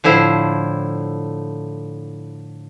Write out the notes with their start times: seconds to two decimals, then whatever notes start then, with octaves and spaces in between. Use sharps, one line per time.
0.04 A2 D3 F3 E4 C5